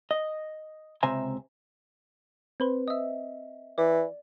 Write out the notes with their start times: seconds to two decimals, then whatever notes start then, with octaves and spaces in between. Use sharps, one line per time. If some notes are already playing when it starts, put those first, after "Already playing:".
0.11 D#5
1.03 C#2 C3 C5 E5 G#5 A#5
2.60 C4 B4 C5
2.88 D#5 E5
3.78 E3 D5